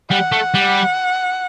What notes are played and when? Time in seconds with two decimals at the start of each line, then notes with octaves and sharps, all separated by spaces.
0.11 G3 F#5
0.32 A3
0.54 G3